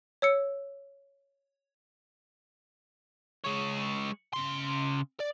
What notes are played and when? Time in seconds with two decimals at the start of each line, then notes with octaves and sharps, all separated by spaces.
0.22 C#5 E6 C#7
3.44 G#3 C#5
4.33 C#3 C6
5.20 D5